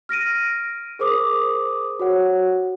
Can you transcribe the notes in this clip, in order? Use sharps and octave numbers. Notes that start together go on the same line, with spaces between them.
F6 A#6 D7 D#7
G#4 A#4 C5 D6 D#6
F#4 C#5 F#5